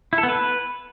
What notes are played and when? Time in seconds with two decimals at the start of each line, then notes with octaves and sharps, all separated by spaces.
0.13 E4
0.18 A4
0.23 B3
0.29 B4